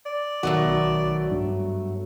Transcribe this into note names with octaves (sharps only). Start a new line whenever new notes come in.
D5
B1 D#3 F#3 A3 B3 F#4
G2